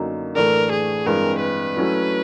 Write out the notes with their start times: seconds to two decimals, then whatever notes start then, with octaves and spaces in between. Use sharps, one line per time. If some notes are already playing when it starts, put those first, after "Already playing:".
Already playing: F#2 D3 F#3 A#3 D#4
0.36 A2 E3 A3 D4 A#4
0.72 G#4
1.06 G2 E3 G#3 C4 A#4
1.41 B4
1.77 F#3 A3 C#4 E4